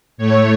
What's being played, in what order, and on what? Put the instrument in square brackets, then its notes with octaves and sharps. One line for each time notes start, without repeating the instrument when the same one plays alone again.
[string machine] A2 A3 C#5